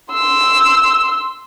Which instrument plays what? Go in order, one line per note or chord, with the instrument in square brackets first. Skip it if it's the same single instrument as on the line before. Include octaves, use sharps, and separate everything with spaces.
[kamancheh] C6 E6